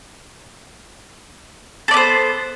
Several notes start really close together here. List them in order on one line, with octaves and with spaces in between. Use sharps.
A4 D5 B3 C5